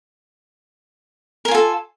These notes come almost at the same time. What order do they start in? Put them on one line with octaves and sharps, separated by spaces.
A#4 G#5 F4 A4